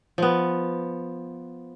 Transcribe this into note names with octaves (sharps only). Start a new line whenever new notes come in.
F3 B3